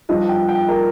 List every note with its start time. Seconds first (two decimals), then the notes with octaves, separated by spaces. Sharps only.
0.09 G2 F3 D#5
0.29 G5
0.49 G5
0.69 A#4